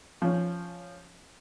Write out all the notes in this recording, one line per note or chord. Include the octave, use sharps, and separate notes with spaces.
F3 C#4